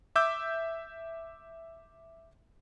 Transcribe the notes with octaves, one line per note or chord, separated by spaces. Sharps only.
E5 D6 E6 G6